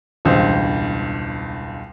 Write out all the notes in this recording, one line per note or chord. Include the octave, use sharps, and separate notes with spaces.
E1 C#2 G2 C5